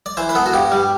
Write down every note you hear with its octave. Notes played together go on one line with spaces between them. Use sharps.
D5
E3 C5
B4
B3 A4
F#4
G2 G4
G3